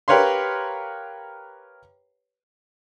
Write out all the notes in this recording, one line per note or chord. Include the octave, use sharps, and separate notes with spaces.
G4 A#4 B4 C#5 F5 C6